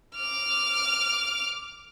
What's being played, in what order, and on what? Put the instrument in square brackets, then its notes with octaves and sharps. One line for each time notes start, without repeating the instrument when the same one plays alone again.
[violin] D6 F6